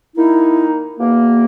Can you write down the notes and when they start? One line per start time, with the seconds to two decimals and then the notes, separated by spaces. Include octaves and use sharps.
0.16 D#3 A#3 D#4 E4
0.99 E2 B2 A#3